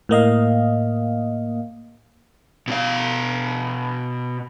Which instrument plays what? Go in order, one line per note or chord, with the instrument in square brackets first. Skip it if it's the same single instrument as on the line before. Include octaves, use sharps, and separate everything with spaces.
[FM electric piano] A2 A#3 D#5 F5
[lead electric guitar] B2 F5